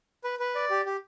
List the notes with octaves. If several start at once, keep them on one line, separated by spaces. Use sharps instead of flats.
B4
B4
D5
G4
G4